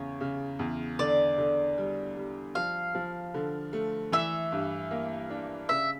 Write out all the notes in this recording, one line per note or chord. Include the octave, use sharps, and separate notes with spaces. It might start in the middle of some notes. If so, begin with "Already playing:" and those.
Already playing: E2 C#3 C#5
C#3
E2
D3 D5
D3
G3
G3
F3 F5
F3
D3
A3
E3 E5
G2
A#3
D4
C#3 E5